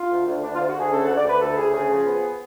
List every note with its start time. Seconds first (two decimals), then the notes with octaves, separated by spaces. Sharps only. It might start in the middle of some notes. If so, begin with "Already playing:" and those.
Already playing: F4
0.10 D2
0.26 D2
0.42 D2 D4
0.54 F4
0.59 D2
0.67 F#4
0.75 D2 G#4
0.91 C#3 A4
1.04 D2 F#5
1.16 D5
1.24 D2
1.29 B4
1.41 D2 A4
1.57 D2 G#4
1.73 C#3 G#4
1.90 F3 G#4
2.07 B3